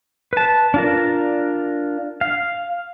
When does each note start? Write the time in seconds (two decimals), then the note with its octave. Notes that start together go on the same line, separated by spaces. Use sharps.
0.33 B4 A5
0.74 D4 F4 A#4
2.21 F5